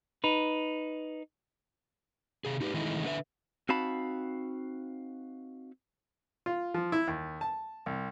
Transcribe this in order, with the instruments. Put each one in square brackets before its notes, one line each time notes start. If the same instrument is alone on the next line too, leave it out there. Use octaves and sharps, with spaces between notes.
[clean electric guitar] D#4 B4
[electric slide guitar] C3 G#4
D#4 G4 G#4 B4
D#3 E3 G#3 A3 D#4 E4
D3 B4 E5
[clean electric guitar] C4 D#4 F#4 F5 A5 B5
[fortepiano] F4
F3
E4
D#2
A5
C2